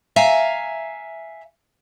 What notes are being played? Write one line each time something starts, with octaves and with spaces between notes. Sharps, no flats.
E5 F5 G#5 A#5